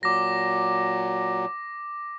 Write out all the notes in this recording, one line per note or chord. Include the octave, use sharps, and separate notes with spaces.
A#2 F#3 D6 A#6